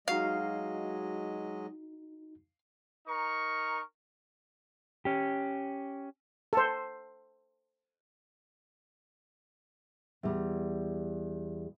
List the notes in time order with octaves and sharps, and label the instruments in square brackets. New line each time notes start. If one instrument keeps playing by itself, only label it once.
[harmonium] F#3 G#3 D#5 [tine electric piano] D#4 F#4 C7 [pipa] F5
[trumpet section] D#4 A#4 C#6
[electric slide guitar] C#4 G4
[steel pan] A4 C5
[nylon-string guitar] E2 G3